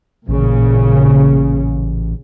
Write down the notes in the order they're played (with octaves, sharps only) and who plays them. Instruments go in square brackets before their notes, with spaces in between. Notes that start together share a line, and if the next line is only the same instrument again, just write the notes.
[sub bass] A1 [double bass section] A#2 C#3